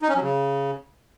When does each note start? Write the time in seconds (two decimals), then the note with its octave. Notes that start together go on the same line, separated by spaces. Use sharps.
0.02 D#4
0.09 C#4
0.15 F#3
0.22 C#3